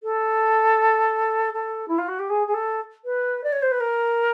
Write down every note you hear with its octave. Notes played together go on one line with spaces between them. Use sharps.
A4
A4
E4
F4
F#4
G4
G#4
G#4
A4
B4
D5
C#5
C5
B4
A#4